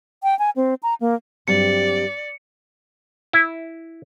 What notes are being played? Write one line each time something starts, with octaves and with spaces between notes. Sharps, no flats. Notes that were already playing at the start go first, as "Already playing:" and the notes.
G5
G#5
C4
A#5
A#3
G2 F#3 C4 G4 D5 C#7
E4